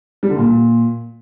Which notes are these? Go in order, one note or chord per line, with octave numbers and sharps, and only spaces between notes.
G3
D3
A#2